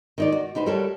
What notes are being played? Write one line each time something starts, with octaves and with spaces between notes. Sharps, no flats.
D#3 D#4 D5
F#4
D2 D#4 B4 C5
G3 F#4 A4 A#4 C#5